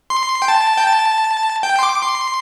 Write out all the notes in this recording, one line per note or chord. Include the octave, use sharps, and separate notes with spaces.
C6
G5
A5
G5
A5
G5
C6
D6
C6